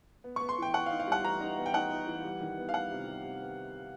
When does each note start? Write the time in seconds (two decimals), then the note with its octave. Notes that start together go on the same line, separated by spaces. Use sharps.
0.24 B3
0.36 C#6
0.40 B3
0.49 C6
0.58 E3 G5
0.74 B3 F#5
0.86 F5
0.90 D#4
1.00 F5
1.07 G3 F#5
1.24 E3 A#5
1.41 D#4
1.57 B3
1.66 G5
1.74 D#4 F#5
1.91 D#4
2.07 E3
2.24 G3
2.41 D#3
2.58 B3
2.69 F5
2.73 G3 F#5
2.91 C3
3.07 G3
3.24 C3
3.41 B3